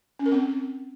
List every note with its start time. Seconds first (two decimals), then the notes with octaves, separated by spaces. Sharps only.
0.19 C#4
0.26 A#4
0.32 C4